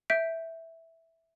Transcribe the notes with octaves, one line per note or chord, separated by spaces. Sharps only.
E5 G6 B6 D7